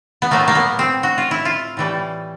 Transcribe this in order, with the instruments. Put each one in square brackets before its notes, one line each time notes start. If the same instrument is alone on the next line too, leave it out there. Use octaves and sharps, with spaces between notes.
[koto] B3
A2 F#3 A3 A#3
A#3
B3
C4
F#4
F4
E4
F4
A2 E3 G3